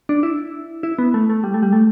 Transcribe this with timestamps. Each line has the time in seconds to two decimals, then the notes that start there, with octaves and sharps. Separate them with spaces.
0.09 D4
0.23 E4
0.83 E4
0.99 B3
1.14 A3
1.30 A3
1.44 G3
1.54 A3
1.63 G3
1.73 A3